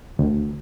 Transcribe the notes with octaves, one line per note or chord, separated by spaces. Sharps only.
D2